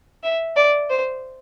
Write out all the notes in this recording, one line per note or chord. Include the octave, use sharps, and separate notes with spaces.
E5
D5
C5